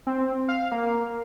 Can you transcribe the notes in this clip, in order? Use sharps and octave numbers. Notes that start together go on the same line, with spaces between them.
C4
F5
A#3